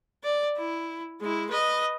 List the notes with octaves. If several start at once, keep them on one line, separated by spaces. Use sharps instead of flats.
D5
E4
G#3 E4
B4 D#5